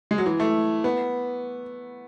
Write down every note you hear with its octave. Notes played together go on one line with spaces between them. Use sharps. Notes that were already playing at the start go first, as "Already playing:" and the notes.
G#3
F#3
E3
A3
B3